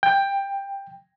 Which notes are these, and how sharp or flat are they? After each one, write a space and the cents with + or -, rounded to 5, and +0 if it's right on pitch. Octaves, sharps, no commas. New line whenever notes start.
G5 +15